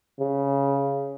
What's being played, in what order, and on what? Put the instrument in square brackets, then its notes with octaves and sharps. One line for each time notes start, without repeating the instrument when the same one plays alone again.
[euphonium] C#3